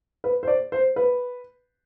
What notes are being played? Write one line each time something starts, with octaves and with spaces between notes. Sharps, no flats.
B4
C5
D5
C5
B4